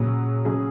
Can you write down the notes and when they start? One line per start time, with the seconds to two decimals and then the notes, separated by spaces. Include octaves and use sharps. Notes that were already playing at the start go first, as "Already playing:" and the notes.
Already playing: A#2 C#3 F#3 C#4 G#4
0.45 C#3 F#3 C#4 G#4